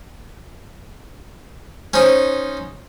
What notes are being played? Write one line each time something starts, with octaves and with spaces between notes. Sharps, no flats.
C#4 D#4 C5